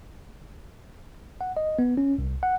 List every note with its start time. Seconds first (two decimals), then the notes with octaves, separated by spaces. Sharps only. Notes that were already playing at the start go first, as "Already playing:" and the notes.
1.41 F#5
1.57 D#5
1.79 B3
1.97 C#4
2.18 C2
2.43 F#5